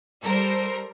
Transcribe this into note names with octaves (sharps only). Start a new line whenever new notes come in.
G3 A4 A#4 C5